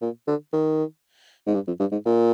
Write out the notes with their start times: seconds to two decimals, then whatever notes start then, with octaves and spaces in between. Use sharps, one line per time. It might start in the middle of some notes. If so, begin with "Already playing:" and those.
0.01 A#2
0.27 D3
0.53 D#3
1.46 G#2
1.55 G2
1.67 F2
1.80 G2
1.92 G#2
2.05 A#2